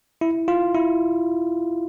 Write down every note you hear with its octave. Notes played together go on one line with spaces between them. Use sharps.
E4
F4
E4